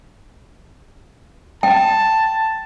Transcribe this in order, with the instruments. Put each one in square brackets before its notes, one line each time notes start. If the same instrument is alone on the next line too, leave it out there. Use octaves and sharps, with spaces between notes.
[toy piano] G5 [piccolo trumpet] A5